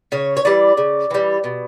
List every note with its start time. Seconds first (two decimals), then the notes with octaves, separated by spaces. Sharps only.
0.12 C#3 C#5
0.37 C#5
0.45 E3 G3 D5
0.77 C#3
1.11 E3 G3
1.44 B2